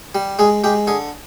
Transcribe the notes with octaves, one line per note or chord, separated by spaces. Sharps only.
G3
G#3 G#4
G#3 G4
D3 G#4